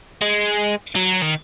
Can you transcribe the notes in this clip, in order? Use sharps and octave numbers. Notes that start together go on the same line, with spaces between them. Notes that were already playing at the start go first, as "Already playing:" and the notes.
G#3
F#3
D#3